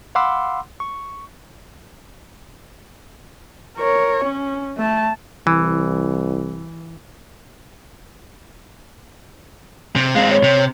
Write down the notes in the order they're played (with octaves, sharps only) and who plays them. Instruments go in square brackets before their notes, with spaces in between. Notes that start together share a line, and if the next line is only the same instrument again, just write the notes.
[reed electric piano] F5 F#5 B5 C6 D6 E6
C#6
[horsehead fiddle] A#4 C#5
C#4
A3 A5
[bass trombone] C2 [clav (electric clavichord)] E3
[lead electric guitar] C3
[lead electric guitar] G#3 C4 [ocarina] F5
[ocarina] C#5
[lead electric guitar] C3